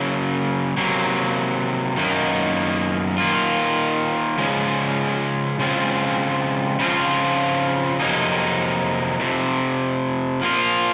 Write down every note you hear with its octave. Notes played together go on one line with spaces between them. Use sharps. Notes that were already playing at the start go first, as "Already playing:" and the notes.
Already playing: C#3 F#3 A#3
C3 F#3 A#3
F#2 D#3 A#3 D#4
D#3 A#3 F4
C#3 F3 G#3
C#3 G#3 C4 F4
C#3 F3 C4 F4
F2 C3 F#3 A#3 D#4
F2 C3
F3 A#3 F4